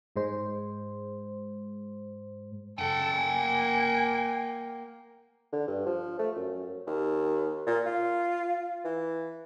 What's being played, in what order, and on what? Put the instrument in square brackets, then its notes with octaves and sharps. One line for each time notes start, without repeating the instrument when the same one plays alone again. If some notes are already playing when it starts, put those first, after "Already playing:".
[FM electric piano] G#2 G#3 C5
[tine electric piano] F#2 C#3 [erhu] A4 [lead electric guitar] F#5 G5
[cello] A#3 [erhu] G#5
[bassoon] D3
G2
F3
A3
F#2
D#2
A#2
F4
E3